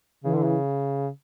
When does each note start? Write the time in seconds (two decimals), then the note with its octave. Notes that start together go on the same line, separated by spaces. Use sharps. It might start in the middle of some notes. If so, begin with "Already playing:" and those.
0.24 C#3 E3
0.35 D3
0.45 C#3